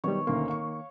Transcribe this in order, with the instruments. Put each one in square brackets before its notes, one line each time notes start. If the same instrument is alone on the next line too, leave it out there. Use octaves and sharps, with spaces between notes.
[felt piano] D#3 B3 [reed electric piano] F#3 G3 [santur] C#5
[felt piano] D2 C#4 C6 [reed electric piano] D#3 A#3
[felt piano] F5 C#6